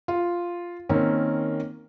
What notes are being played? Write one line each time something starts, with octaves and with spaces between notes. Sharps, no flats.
F4
D#3 A#3 C4 C#4